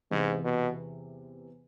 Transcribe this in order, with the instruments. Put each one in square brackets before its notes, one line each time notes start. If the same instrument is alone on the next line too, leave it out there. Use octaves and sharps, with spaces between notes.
[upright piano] E2 C3 E3 [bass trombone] G#2
[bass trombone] B2